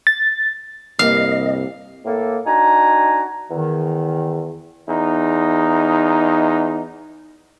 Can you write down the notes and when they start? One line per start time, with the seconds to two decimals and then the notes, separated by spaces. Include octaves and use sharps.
0.07 A6
0.99 C2 G2 C3 A#3 D#5 F5
2.05 A2 A#3 A4
2.47 D4 D#4 F#4 G#5 A#5
3.51 E2 D#3
4.89 E2 D#4